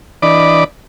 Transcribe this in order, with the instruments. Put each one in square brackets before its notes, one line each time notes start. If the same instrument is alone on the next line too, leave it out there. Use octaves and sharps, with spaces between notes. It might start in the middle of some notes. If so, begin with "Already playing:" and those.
[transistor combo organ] E3 D4 D5 D#5 B5 D6